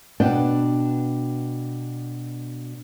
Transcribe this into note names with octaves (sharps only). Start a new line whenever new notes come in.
B2 B3 D4 D5 F#5 G5